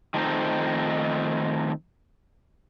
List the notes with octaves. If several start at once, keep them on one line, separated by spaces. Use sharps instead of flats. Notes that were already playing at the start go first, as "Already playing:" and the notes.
D#3 F3 A3 C4 D#4